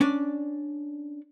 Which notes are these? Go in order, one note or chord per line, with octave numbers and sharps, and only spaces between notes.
C#4 D4 D5